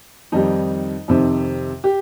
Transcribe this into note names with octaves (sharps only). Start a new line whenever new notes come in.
F2 D#3 G3 D#4
F2 C3 D#3
G4